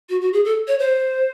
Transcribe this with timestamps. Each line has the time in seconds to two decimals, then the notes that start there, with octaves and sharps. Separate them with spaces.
0.09 F#4
0.21 F#4
0.33 G#4
0.44 A4
0.68 C#5
0.79 C5